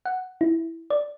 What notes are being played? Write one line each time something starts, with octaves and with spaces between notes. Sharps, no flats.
F#5
E4
D5